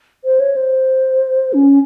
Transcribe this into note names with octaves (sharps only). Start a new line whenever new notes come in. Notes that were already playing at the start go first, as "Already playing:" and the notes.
C5
C#5
C5
C#4